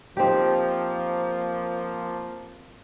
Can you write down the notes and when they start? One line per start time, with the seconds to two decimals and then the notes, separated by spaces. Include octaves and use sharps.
0.17 F3 A#3 C4 D#4 G4